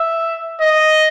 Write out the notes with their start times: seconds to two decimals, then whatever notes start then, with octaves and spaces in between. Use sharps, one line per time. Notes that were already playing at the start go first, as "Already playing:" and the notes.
Already playing: E5
0.61 D#5